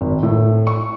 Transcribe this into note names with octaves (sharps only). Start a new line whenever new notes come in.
G#1
A2
C#6